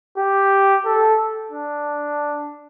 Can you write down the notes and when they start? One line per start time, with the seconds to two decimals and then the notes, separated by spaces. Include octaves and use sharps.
0.18 G4
0.85 A4
1.51 D4